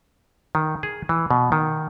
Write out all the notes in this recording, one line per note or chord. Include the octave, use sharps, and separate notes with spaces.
D#3
G#4
E3
B2
D#3